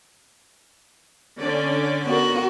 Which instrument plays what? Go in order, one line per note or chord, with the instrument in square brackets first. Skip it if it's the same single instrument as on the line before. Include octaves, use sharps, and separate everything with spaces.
[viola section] D3 C#4 D5
[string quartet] B3 F#4 A#4